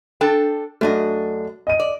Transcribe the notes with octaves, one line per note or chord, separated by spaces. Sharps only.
D4 A4 G5
F#2 A3 D4 F#4 D#5
D#5 D#7
D5